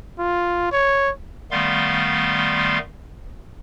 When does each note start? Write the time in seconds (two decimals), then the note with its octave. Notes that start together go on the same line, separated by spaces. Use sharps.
0.19 F4
0.72 C#5
1.51 D#3 G3 A3 B3 F5 C6